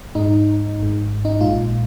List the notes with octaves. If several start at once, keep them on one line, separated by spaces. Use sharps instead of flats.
G#2 G#3 D#4
G#1 G#2 G#3
D#4
A#1 A#2 G#3 F4